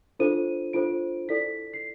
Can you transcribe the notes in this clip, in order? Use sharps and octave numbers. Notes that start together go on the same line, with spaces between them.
D4 F4 A4 C5 D#7
D4 F4 A4 C5 D7
E4 A4 D5 B6
C7